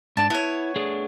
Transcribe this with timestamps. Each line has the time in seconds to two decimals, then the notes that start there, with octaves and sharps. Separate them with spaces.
0.17 G#2 D4 A5
0.30 B3 E4 C#5
0.76 A3 D4 G#4